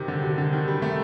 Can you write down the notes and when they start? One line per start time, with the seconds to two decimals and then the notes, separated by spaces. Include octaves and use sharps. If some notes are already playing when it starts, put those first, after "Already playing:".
Already playing: C3 D#3
0.08 D3
0.23 C3
0.38 D3
0.53 D#3
0.68 G3
0.82 A3